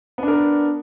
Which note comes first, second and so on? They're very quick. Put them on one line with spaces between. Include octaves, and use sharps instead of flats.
B3 D4 A#4